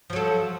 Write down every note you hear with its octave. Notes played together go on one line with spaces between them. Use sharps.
F3 F#3 A4